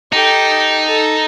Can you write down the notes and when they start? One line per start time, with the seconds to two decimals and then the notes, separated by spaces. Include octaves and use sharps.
0.13 D#4 G4 A4
0.86 A4